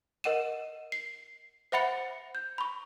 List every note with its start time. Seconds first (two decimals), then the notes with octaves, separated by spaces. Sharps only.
0.24 A#4 D#5 F#5 D#7 E7
0.92 C7
1.72 C5 E5 F#5 B5 A6 C#7
2.35 G6
2.58 B5 C#6